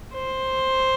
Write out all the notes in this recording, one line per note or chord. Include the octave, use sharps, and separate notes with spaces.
C5